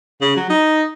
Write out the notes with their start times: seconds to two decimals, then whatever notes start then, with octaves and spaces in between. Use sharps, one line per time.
0.21 C#3
0.36 F#3
0.50 D#4